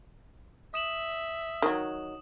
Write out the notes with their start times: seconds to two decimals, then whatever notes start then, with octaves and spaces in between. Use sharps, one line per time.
0.74 E5 D#6 E7 F#7
1.62 D#3 F#3